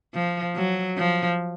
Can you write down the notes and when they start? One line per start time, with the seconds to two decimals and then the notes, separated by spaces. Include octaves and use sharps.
0.14 F3
0.56 F#3
0.97 F3